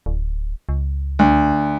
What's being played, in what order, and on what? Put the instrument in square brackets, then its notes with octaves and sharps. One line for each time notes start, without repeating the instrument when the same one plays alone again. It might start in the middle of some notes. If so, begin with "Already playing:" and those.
[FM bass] D1
C#2
[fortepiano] D2